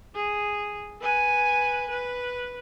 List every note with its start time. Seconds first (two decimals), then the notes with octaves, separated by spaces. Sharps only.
0.15 G#4
1.01 B4 G#5
1.90 B4